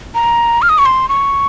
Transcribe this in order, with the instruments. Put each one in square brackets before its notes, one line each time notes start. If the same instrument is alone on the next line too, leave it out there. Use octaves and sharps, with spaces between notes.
[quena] A#5
F6
D#6
C#6
C6
C#6